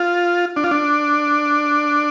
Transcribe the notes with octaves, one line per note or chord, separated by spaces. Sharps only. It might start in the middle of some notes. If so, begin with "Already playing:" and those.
Already playing: F4
D4
F4
D4